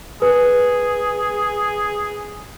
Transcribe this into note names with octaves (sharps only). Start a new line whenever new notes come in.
G#4 B4